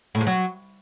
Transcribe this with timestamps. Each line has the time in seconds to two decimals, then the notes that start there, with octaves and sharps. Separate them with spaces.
0.15 A2
0.21 G#2
0.27 F#3